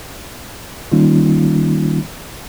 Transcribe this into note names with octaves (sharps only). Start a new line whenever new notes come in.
D#3 G3 A#3 C#4 D#4 F4